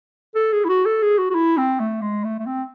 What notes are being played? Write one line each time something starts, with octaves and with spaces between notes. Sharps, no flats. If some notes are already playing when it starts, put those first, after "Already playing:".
A4
G#4
E4
F#4
A4
G#4
F#4
F#4
E4
C4
A3
G#3
A3
A3
C4